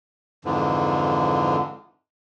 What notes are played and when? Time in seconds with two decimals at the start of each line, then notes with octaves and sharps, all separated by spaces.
0.45 F2 G#2 D3 E3 F3